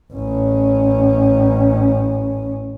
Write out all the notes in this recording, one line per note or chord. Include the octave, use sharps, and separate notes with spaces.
A1 C#4